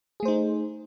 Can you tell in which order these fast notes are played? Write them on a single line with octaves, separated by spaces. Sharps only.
G#4 A3 C5 D#4